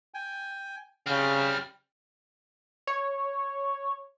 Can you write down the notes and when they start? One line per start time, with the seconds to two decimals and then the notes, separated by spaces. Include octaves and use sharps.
0.14 G5 G#5
1.07 C#3 G3 C4 F6
2.87 C#5